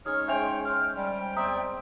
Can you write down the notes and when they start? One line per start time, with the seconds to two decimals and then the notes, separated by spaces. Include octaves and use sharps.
0.06 G#3 C#4 D#4 C#5 D#6 F6
0.28 G#3 C#4 C5 E5 G5 G#5 F7
0.65 F6
0.96 G3 G5
1.36 E2 C4 D5 E5 A#5 D#6